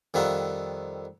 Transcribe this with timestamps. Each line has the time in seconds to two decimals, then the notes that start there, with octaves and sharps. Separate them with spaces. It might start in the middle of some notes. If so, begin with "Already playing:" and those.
0.14 F2 D#3 G3 F4 E5 F#5